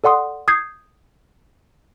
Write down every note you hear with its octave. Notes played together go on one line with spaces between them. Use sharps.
A4 D5 F#5 C6 D#6
D#6 G6 G#6 C7